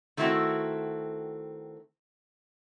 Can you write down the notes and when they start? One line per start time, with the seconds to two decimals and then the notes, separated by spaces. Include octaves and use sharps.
0.17 D#3 A3 C4 E4 F#4 A4